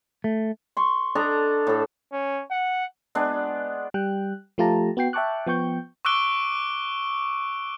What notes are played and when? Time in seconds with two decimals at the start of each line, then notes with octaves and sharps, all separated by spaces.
0.24 A3
0.77 C6 C#6
1.15 D4 A4 D#5 A#5
1.67 A2 A4
2.13 C#4
2.51 F#5
3.15 G#3 B3 D4
3.94 G3 G5 F#6
4.58 F3 A3 F4 G4 A5 A#5
4.97 B3 F#4 G5 C7
5.13 E5 G5 A5 C#6 D6 F#6
5.47 F3 B3 G5 C#6 G6
6.05 C#6 D6 E6 F#6 D7 G7